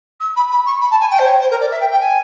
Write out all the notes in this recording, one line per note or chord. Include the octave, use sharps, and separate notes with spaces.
E6
B5
B5
C#6
B5
A5
G#5
G5
C5
C#5
C5
A#4
D5
E5
G5
G5
G#5